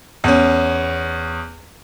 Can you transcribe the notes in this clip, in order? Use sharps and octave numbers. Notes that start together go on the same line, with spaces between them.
E2 C#4